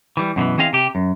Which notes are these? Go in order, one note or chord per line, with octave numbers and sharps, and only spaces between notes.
E3 G3
F#2 B2 D3 E3
E3 C4 G#4 D#5 F5
C3 G4
F#2